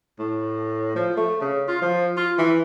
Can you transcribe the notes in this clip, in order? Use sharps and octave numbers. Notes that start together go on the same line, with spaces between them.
A2
F3
A3
C#3
F4
F3
F4
E3